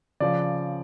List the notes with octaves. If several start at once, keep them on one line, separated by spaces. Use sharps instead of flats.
C#3 F3 D5